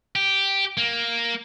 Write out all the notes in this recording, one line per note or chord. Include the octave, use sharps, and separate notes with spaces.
G4
A#3